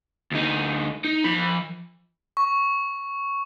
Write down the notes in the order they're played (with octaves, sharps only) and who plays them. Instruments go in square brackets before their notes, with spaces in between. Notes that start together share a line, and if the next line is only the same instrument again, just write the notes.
[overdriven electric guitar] D2 D#4
D#4
F3 B5
[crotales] C#6